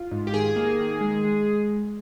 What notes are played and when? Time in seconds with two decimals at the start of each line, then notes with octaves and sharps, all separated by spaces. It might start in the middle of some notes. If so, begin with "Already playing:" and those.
Already playing: F4
0.11 G#2
0.27 G4
0.34 D#3 G#4
0.56 A#3
0.79 D#3
1.01 G#3
1.24 G#3